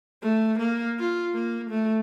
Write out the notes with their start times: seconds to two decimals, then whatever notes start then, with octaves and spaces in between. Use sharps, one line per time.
0.22 A3
0.59 A#3
0.99 F4
1.34 A#3
1.70 A3